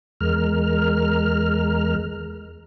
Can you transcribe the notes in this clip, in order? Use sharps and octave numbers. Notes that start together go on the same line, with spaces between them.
E2 G#3 A#4 F6